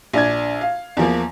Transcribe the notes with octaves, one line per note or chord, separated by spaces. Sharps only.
A#1 D4 G#6
F5
E2 F3 A#3